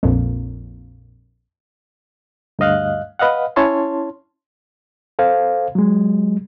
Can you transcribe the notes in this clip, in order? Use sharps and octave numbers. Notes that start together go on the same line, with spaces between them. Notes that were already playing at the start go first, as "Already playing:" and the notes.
A#1 F2 A#2
D2 G2 D#5 F5 F#6
B4 D#5 F5 F#5
C#4 E4 C#5 A5 C6
A4 C5 F5
F#3 G#3